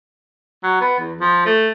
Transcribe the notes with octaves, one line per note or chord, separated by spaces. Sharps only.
F#3
B3
E2
F3
A3